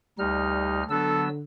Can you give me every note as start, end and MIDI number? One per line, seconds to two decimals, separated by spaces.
0.18 0.83 38
0.18 0.82 55
0.18 0.83 63
0.18 0.83 89
0.90 1.43 50
0.90 1.28 54
0.90 1.28 59
0.90 1.25 69
0.90 1.28 88